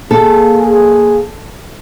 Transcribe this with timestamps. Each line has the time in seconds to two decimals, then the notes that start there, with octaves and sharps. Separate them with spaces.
0.11 A#3 G#4 A4